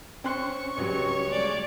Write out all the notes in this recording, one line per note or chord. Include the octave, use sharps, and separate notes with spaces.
C4 C#4 C#6 F#6
C#2 F#3 G3 C#5
G#3 A3 D5